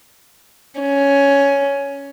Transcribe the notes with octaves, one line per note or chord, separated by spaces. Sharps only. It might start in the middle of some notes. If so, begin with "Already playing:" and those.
C#4